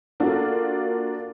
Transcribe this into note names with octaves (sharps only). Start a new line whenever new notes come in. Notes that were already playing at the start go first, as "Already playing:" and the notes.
A#3 D4 F4 F#4 A4 A#4